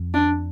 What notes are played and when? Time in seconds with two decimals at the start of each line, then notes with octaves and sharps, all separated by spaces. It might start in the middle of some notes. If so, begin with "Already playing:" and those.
Already playing: F2
0.14 D4